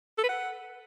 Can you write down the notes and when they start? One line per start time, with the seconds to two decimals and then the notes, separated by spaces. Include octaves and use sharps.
0.18 A4
0.23 B4
0.29 F#5